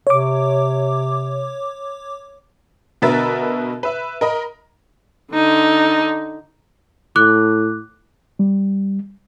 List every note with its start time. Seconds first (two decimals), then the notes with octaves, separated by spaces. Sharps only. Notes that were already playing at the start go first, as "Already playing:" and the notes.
0.07 C3 C#5 D6
3.02 B2 D3 A#4 B4 E5 A6
3.83 B4 E5
4.21 A#4 D#5 B5
5.33 D3 D#4
7.16 A2 D6 F#6
8.39 G3